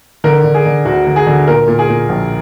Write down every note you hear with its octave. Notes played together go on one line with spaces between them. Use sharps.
D3 A#4
D3
G#4
D3
D2 F#4
D3
G#4
D3
A#2 A#4
A#2
G#4
A#2
A#1